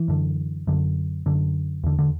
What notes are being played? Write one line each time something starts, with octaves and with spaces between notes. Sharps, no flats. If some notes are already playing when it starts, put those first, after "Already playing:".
Already playing: E3
F#2 D3
F#2 D3
F#2 D3
E2 D3
D3